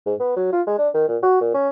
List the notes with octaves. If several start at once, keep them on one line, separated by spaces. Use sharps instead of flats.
G#2
B3
F#3
F4
G#3
D4
D#3
A#2
F#4
A#2
C#4